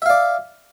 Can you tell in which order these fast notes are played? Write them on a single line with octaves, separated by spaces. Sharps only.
E5 F5 D5